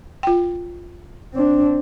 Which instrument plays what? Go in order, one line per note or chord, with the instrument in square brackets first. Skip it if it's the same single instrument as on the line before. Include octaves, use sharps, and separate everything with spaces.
[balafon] F4 G5
[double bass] C4 D4